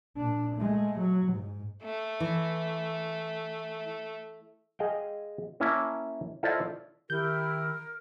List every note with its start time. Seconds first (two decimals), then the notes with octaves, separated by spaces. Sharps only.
0.17 A#2 D4
0.56 G#3 A3
0.99 F#3
1.33 G#2
1.83 A3
2.20 E3
4.79 G#4 D#5 F5 G5
5.60 A#3 C#4 E4 G#5 A5
6.43 E4 F4 A4 C5 D5 D#5
7.10 D#3 E4 G4 A#4 G6